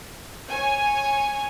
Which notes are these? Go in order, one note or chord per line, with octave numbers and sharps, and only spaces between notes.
C#5 G#5